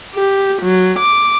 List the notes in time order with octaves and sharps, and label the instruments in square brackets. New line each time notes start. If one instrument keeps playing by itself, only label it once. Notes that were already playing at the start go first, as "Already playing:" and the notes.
[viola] G4
F#3
D6